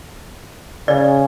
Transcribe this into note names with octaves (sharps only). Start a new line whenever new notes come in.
C#3 D5